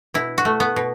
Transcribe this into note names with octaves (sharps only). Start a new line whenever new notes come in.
B2 E4
F#4
A3
B3
B2